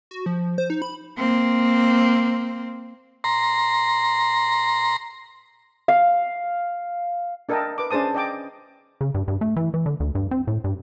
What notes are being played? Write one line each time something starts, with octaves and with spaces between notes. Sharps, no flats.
F#4
F3
C5
D#4
B5
A#3 C4
A#5 C6
F5
D4 A4 A#4 D#5 G5 A5
B4 D6
C#4 D4 G#4 C5 A5 D#6
D5 D#5 G5 D6
C#3
G2
G2
A3
E3
E3
D3
D2
G2
C4
A2
G2